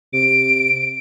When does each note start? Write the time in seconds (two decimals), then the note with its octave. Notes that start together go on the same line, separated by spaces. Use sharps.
0.13 C3 D7